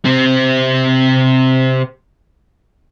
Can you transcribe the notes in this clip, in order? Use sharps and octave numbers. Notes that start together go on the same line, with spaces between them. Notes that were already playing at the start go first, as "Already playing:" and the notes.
C3 C4